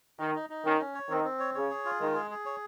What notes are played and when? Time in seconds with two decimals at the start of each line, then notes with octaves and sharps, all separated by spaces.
0.19 D#3 D#4
0.35 D#4
0.50 D#4
0.64 D#3 C#4
0.80 C#4
0.95 C#5
1.10 D#3 C4
1.24 C4
1.39 C#5
1.54 C#3 C#5
1.71 G#4
1.85 F4
2.00 D#3 G#3
2.15 G#4
2.31 G#4
2.46 C#5